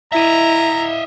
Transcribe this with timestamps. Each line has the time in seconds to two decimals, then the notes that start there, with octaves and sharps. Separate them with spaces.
0.12 E4 D#5 E5 A#5